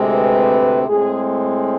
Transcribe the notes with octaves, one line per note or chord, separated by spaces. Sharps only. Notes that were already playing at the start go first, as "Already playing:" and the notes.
Already playing: D2 C3 G#3 C4
B4
A2 G#3 C4 G#4